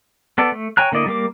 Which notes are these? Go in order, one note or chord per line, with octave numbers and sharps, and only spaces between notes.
B3 A4 D5
A3
C#5 G5 G#5 A#5 F#6
D3 A#3 E4 D5 D#5
G3 A#3 D6